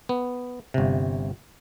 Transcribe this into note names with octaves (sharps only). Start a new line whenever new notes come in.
B3
G1 C3